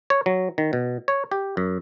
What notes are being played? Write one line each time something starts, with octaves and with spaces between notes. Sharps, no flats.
C#5
F#3
D#3
B2
C#5
G4
F#2